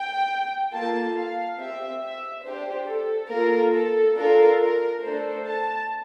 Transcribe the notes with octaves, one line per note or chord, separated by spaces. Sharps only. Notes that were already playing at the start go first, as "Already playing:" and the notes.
Already playing: G5
A#3 F4 A4 A5
F5
C4 G4 E5
E5
D4 G4 C5
A4
A#3 F4 A4 A#4
A4
D4 F4 A4 A#4
A#4
A3 D4 A4 C5
A5